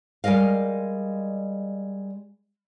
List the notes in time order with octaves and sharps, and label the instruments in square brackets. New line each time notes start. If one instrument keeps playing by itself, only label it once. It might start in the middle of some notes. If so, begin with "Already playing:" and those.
[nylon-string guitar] G3 G#3 A#4 D#5 F5